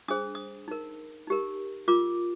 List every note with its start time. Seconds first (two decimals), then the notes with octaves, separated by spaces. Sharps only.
0.08 D4 G#4 C5 D#6
0.35 D#6
0.68 D#4 A#4
1.27 D#4 G4 A#4
1.88 F4 A#4 D6